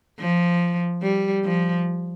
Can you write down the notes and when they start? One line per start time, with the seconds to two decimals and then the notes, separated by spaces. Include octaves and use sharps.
0.19 F3
1.02 G3
1.44 F3